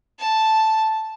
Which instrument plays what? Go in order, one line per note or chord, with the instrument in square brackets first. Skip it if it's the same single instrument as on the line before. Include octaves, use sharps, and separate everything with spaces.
[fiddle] A5